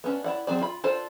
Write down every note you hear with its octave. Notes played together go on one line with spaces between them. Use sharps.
B3 C#4 D4
E4 D5 F#5
F#3 C4 G#4 D5
F4 B5
D4 F4 A4 C5